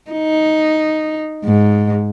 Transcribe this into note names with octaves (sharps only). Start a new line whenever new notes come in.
D#4
G#2